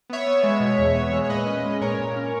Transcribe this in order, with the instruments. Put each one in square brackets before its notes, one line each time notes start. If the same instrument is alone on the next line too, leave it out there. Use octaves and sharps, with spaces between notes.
[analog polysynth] B3 C#5 E5
B3
G#3
B2
E2
B3
G#3
C#5
A#2 B4 D#5
C#4
G#3
A#2 A#4 C#5
A#2
C#4